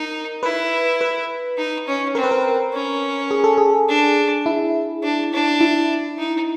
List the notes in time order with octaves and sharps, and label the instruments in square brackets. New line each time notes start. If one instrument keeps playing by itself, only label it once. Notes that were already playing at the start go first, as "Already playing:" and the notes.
Already playing: [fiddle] D#4 [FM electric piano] A#4
[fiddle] E4 [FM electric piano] B4
[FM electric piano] B4
[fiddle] D#4
C#4
[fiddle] C4 [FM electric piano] A#4
[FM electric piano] B4
A#4
[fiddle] C#4
[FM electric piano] G#4
A4
G#4
[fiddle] D4
[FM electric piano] E4
[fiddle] D4
D4
[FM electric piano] E4
[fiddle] D#4